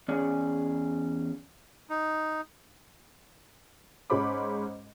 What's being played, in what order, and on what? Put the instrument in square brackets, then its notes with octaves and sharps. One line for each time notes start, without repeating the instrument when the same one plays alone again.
[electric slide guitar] E2 C#4 G#4 D5
[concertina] D#4
[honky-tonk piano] G#2 G#3 C#4 C5 B5 D6